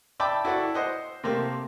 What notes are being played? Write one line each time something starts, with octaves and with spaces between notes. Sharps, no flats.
D5 E5 G5 A5 B5 D6
E4 F#4 A4 D5
C5 D#5 F#5
C3 A3 A#3 C4